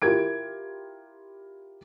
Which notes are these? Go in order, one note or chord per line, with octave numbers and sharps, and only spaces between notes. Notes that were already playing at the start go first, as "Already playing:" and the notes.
E4 F4 G4 A#4 G#6 D7